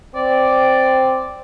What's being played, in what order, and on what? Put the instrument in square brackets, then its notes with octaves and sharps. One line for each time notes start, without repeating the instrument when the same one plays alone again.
[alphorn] C4 [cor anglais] D5